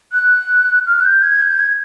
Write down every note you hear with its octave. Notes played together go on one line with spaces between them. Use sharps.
F#6
F6
F#6
G6
G#6
G6
G#6